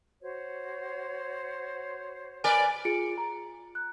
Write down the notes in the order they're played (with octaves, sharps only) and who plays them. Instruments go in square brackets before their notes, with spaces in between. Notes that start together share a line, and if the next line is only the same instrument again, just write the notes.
[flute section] F#4 C5 C#5
[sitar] A#4 B4 D5 [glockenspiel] G#5
[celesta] F4 G#4 C#7 D7
A#5
F#6